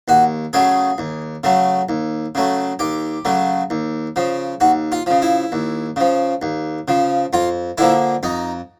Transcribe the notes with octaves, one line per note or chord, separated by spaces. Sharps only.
D#2 F#4
C#3 F#3 A3 G#4
D#2
C#3 F#3 A3
D#2
C#3 F#3 A3
D#2 G4
C#3 F#3 A3
D#2
C#3 F3
D#2 F#4
F4
C#3 F3
E4
D#2
C#3 F3
D#2
C#3 F3
F2 F4
D3 F3 A#3 E4
F2 D#4